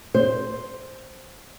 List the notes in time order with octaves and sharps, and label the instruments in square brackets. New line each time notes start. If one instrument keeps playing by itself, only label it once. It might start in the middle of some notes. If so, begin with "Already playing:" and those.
[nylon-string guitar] C5